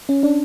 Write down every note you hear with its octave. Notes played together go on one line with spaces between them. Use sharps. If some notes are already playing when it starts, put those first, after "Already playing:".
C#4
D4